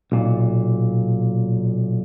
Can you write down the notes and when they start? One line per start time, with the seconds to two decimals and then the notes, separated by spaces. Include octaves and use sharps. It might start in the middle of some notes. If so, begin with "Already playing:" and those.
0.12 B1 A#2